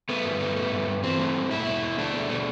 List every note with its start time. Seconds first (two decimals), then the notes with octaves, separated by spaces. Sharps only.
0.09 A3 B3
0.25 G2
0.41 A3
0.56 A3
0.72 G2
0.87 G2
1.04 E3 C4
1.19 A3
1.36 G2
1.51 B2 E4
1.66 B2
1.83 B2
1.98 A3 D4
2.14 B2
2.29 B2 A3